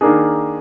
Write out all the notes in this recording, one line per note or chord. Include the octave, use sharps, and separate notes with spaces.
D#3 A#3 D4 G#4